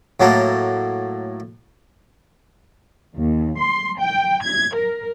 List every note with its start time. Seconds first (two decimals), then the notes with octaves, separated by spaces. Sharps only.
0.20 A2 F#3 A3 A#3
3.17 D#2
3.60 C6
4.00 G5
4.44 G#6
4.76 A#4